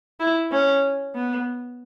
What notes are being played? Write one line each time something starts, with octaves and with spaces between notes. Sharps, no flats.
E4
C#4
B3